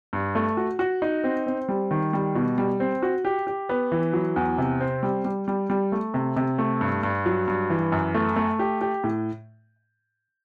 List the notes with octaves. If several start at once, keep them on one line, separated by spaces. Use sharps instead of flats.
G2
A3
F#4
F#4
D#4
C4
C4
G3
D#3
G3
B2
G3
C4
F#4
G4
G4
B3
E3
F#3
E2
C3
C4
G3
G3
G3
G3
A3
C3
C3
A3
G2
G2
F#3
G2
E3
F#2
A3
A3
G4
G4
A2